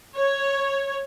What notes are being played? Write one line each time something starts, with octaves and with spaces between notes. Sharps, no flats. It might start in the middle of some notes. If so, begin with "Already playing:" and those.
C#5